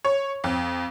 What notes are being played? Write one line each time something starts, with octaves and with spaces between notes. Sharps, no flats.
C#5
F2